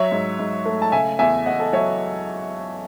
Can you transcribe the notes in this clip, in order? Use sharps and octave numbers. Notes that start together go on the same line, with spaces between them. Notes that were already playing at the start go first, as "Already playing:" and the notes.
Already playing: F#3 C#5 E5
G#2
G#2
A3
A5
C#3 E5 G#5
E2 E5 G#5
E2 D#5 F#5
A4
F#3 C#5 E5